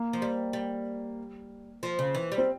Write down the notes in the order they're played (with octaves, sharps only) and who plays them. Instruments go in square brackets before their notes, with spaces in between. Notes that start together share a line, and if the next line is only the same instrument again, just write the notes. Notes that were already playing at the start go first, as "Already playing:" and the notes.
Already playing: [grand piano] A#3
[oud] F3
G3
G3
F3
C#3
E3
G3
[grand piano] C4